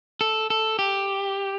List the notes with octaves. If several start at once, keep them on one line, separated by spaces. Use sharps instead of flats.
A4
A4
G4